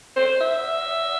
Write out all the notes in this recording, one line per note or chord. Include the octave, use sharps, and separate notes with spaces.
C5
E5